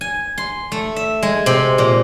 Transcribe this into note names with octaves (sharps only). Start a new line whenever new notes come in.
G#5
C6
A3
E5
G#3
C3
A#2